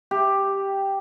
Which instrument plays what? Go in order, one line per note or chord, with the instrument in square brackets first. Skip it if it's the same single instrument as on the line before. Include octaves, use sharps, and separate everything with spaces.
[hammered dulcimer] G4